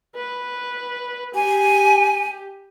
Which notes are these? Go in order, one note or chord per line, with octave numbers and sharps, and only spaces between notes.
B4
G4 G#5